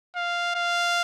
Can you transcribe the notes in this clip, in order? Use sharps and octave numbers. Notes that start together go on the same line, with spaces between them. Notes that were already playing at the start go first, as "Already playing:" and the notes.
F5
F5